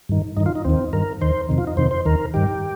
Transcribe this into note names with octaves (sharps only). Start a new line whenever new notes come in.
G2 D#3
G2 D#3 D#4
F4
D#4
D#2 D#3 C4
G2 D#3 A#4
D#2 D#3 C5
F2 C3 D#3
F4
D#4
F2 C3 D#3 C5
C5
D#2 D#3 A#4
G2 D#3 G4